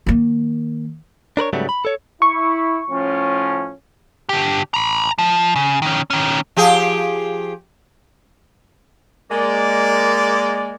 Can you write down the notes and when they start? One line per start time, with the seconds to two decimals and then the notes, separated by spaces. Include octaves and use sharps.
0.06 D#3 A#3
1.37 D4 A#4 B4 C#5
1.53 G#2 C#3 F#3 G3 A3 B3
1.69 B5
1.85 A4 C#5
2.22 E4 C#6
2.91 A2 F3 C#4
4.29 D3 G4
4.74 A#5 B5
5.18 F3
5.56 C#3
5.82 D#3 C#4
6.10 D#3 C#4
6.56 F3 G4 G#4
9.30 G#3 A#3 D5